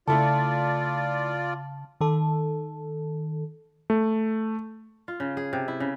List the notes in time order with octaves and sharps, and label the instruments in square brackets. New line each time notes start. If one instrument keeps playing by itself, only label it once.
[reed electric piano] C#3 [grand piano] A3 E4 A4 [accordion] F4 D5 [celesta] A5
[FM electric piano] D#3 A4
[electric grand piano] A3
[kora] F4
C#3
G#4
C3
E4
C#3